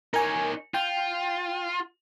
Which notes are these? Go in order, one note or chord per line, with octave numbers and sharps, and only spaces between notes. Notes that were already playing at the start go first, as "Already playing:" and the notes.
D#4 A#4 C#5 G#5
F4 G5